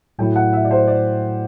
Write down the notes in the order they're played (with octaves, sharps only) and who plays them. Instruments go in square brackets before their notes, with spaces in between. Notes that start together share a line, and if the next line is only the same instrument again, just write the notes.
[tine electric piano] A2 F#3 A3 E4 [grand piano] G5
[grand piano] F#5
E5
D5
C5
D5